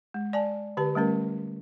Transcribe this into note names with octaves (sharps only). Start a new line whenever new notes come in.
G#3
D5 G#5 A5
D3 G4 B4 A5
G3 A3 C#4 A#4